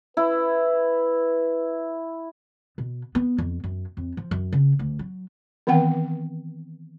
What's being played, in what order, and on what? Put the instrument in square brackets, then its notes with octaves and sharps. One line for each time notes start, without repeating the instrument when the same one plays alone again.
[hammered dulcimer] E4 [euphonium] B4
[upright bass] B2
B3
F2
F#2
F2
F3
F#2
C#3
D2
F#3
[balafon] D#3 E3 B3 C4 F#5 G5